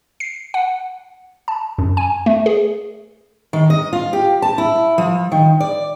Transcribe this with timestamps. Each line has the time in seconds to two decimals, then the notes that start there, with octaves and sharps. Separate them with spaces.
0.20 C7
0.54 F#5
1.48 A5
1.78 F#2
1.97 G#5
2.26 A3
2.46 G#4
3.53 D#3
3.70 D#5
3.93 F4
4.13 G4
4.42 A5
4.58 E4
4.98 F3
5.32 D#3
5.60 D5